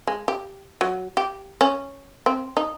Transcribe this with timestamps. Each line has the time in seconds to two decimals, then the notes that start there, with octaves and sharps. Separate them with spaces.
0.07 G#3
0.28 G4
0.81 F#3
1.17 G4
1.61 C#4
2.26 C4
2.57 D#4